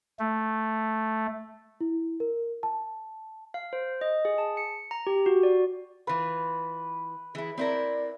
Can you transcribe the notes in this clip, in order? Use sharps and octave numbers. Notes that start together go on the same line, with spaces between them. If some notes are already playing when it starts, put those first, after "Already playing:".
A3
E4
A#4
A5
F5
C5
D#5
G#4
A5
C#7
A#5
G4
F#4
D5
E3 F4 B4
E3 E4 G#4
C4 E4 A#4 D5